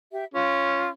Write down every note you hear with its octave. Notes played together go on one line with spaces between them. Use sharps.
G4 E5
C#4 F4